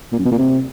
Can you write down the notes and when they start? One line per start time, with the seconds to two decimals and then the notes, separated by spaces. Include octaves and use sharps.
0.12 A#2
0.19 F#2
0.25 B2
0.32 A#2
0.38 C3